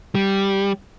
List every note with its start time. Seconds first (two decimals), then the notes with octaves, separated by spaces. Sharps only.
0.15 G3